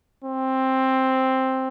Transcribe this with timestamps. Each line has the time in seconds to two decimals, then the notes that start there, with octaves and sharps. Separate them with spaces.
0.25 C4